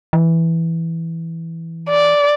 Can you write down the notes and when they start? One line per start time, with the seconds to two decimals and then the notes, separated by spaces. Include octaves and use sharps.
0.13 E3
1.89 D5